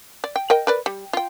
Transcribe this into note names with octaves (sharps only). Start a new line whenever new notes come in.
D5
G5
A#4 D#5 G5
A#4 B4 D5
G3
F4 G5